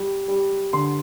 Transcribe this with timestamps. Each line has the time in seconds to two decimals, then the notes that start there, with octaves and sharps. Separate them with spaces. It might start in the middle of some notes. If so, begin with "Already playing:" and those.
Already playing: G3
0.28 G3
0.73 D3 C6